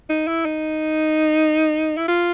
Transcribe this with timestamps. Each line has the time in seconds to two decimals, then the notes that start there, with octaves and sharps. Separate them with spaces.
0.10 D#4
0.27 E4
0.46 D#4
1.97 E4
2.08 F4